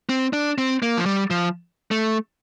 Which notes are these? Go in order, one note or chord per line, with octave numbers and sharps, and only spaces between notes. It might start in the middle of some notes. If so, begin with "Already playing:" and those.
C4
D4
C4
A#3
F3
G3
F3
A3